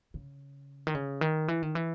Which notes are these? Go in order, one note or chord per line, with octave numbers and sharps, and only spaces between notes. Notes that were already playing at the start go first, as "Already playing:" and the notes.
C#3
D#3
C#3
D#3
E3
D#3
E3